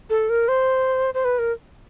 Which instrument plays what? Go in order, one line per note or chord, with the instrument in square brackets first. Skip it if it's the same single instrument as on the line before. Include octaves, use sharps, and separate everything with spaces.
[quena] A4
A#4
C5
C5
B4
A#4